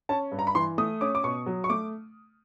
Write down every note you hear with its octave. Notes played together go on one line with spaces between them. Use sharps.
C#4 A5
G2
A#5
B5
E3 C6
A3 D#6
C#4 D6
D6
B2 C#6
F#3
C#6
A3 D6